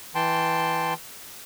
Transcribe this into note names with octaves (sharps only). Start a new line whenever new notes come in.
E3 G5 A5 C6